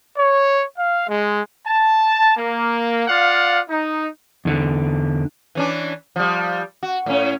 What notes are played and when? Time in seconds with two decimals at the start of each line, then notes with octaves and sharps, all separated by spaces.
0.18 C#5
0.78 F5
1.08 G#3
1.66 A5
2.37 A#3
3.07 F4 D5 F5 F#5
3.69 D#4
4.45 E2 D3
5.55 E3 C#4 D4
6.16 F3 G3
6.83 F#4
7.06 A2 C#4